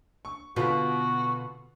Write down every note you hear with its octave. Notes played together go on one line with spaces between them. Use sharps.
C#6
B2 D3 B3 F4 F#4 B4